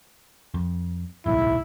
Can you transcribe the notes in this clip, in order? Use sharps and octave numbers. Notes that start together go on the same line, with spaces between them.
F2
D1 B1 G#2 E4